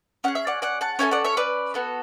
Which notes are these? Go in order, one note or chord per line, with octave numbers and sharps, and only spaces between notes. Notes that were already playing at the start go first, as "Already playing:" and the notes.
C#4 G#4 F#5
E5
D5 F#5
D5 F#5
F#5 A5
C#4 F#4 A4 E5 G#5
D5 F#5
C#5 E5
B4 D5
B3 F#4 A4